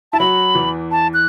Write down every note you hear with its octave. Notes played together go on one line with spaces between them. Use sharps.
E4 A5
F#3 F#4 B5
E2 E3
A5
F#6